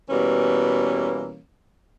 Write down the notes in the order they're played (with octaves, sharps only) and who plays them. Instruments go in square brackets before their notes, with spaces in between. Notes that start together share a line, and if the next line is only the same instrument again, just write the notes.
[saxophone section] B2 E3 G3 A#3 C#4